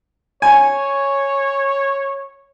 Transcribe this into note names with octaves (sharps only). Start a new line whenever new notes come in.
C#5 G#5